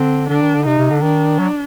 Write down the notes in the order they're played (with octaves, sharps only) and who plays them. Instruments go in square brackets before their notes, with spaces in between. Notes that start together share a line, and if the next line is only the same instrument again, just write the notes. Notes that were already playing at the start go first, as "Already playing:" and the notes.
Already playing: [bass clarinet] D3 [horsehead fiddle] C4
[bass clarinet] D3 [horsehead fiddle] D4
[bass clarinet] D#3
D3
[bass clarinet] C3 [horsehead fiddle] D#4
[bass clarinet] C3
D3
[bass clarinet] D#3 [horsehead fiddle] D4
[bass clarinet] F#3